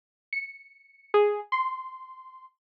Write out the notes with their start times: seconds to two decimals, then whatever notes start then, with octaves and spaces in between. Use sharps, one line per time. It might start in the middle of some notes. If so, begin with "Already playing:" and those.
0.33 C#7
1.14 G#4
1.52 C6